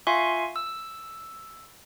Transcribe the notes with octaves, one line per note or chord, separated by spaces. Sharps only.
F4 E5 F5 G#5 C6 C#6
E6